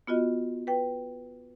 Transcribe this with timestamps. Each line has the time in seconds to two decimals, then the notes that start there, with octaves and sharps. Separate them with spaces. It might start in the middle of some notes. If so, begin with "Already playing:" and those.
0.07 B3 F4 F#4 D#5
0.67 B4 G5